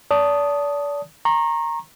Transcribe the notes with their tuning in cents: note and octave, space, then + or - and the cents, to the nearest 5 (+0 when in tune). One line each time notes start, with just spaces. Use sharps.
D5 -35 A5 +0 D#6 +0
A#5 +0 C#6 -40